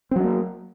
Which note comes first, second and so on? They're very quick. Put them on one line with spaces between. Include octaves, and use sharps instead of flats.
C4 F#3 C#4 A#3